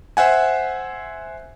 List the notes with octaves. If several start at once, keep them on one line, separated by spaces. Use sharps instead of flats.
C5 E5 F#5 G#5